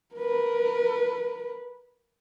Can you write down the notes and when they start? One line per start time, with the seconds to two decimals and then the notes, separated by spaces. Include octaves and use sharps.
0.15 A#4 B4